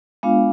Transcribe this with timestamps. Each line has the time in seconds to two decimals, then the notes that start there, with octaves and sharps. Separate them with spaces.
0.23 G#3 B3 D4 F4 F5